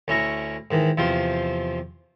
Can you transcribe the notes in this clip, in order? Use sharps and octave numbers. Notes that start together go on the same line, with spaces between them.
D2 C#4 E4 A#5 C#6
G#2 D#3 E3
E2 C3 F3 C4 F4 C5